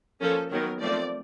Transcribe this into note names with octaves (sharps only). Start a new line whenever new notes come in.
F3 A#3 C#4 A4
D#3 F#3 B3 A#4
F3 A3 C4 D5